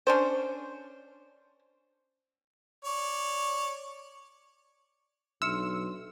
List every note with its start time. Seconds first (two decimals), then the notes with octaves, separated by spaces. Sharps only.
0.07 C#4 D4 C5
2.85 C#5 D5
5.42 B1 D4 E5 C6 E6 F6 C#7